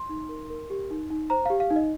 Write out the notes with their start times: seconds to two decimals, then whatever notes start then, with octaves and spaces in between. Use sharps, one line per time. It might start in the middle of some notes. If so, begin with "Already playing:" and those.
Already playing: C6
0.09 D#4
0.29 A#4
0.50 A#4
0.70 G4
0.90 D#4
1.10 D#4
1.30 C5 A#5
1.45 G4 F5
1.60 F5
1.70 D#4
1.76 D#5